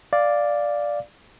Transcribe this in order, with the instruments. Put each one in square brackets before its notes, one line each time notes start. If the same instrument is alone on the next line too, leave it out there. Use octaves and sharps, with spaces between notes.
[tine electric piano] D5 F5